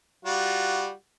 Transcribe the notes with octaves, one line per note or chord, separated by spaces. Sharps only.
G3 F4 F#4